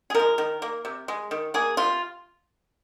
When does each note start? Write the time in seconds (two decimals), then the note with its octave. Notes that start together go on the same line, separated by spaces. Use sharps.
0.10 G#4
0.14 F3 G#3 A#4
0.38 D#3
0.62 A#3
0.85 C3
1.08 G#3
1.31 D#3
1.54 A#3 G#4
1.77 C3 F4